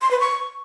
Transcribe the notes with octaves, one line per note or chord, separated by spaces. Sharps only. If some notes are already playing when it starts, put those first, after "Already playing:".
C6
B4
C#6